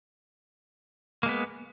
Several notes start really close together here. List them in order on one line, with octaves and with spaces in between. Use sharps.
A#3 G#3 B3